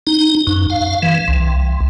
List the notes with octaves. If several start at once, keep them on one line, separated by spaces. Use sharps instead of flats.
D#4
F#2
F5
E3
C2